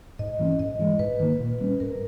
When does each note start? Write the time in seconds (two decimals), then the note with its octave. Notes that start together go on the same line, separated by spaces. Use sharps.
0.19 G#2 D#5
0.39 E3 A#3 C#4
0.59 G#2 D#5
0.79 E3 G#3
0.99 G#2 B4
1.20 D#3 A#3
1.40 A#2
1.61 G3 A#3
1.64 C#4
1.80 G#2 A#4